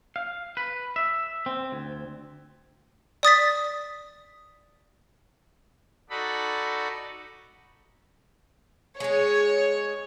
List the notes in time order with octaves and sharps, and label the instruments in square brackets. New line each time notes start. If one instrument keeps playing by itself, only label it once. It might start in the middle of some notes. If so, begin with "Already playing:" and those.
[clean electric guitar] F5
B4
E5
C4
D2
[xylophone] D5 D#6 A6 B6
[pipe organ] D#4 F#4 A4 D5 B5
[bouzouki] G#3 G#4 [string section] C#5